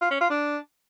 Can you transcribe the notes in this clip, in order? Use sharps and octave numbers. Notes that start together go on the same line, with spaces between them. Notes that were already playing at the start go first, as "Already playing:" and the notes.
F4
C#4
F4
D4